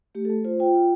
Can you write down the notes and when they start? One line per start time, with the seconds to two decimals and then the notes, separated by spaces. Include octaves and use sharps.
0.15 A3 G4
0.25 A4
0.30 A3
0.44 F4 C5
0.60 F4 G5
0.75 F4